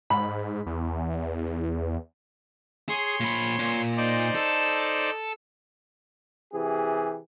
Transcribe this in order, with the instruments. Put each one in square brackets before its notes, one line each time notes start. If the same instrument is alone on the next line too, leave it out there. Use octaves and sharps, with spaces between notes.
[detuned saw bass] G#2 [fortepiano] B5
[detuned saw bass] E2
[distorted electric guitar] G#4 [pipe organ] C#5 C6
[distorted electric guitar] A#2 B5
A#2
[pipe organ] D#4 C5 D5
[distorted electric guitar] A4
[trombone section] C3 E3 G4 G#4